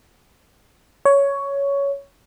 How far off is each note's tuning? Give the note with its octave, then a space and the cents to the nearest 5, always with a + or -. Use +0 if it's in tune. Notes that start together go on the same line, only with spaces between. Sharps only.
C#5 +10